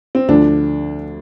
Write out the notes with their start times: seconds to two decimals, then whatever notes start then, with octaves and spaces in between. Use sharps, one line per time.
0.15 C4
0.28 D2 D3 F3 D4